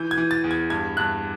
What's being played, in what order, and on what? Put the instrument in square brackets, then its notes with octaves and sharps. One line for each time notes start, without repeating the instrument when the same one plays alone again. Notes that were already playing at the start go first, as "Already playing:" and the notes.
Already playing: [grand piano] E3 G6
G#6
E3
A6
E2
G#6
G2 G#6
G2 F#6